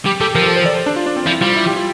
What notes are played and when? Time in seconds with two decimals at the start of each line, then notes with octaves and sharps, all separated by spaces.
0.06 G3 G4
0.21 G3 A4
0.35 F3 A#4
0.46 A4
0.56 C5
0.66 D5
0.76 C5
0.86 D4
0.96 F4
1.06 D4
1.16 C4
1.26 F3 E4
1.41 G3 F4
1.56 E4
1.67 G4
1.77 F4